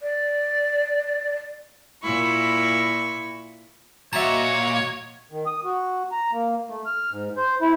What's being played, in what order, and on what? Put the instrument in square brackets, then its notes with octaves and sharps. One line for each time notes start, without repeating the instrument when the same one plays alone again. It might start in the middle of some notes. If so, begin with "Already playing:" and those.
[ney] D5
[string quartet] A#2 E4 B5 C#6
[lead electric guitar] A#2 [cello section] F#4 D#5 [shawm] C#5 [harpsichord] E5 A5
[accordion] D#3
D#6
F#4
A#5
A#3
A3
F6
G#2
C5
E4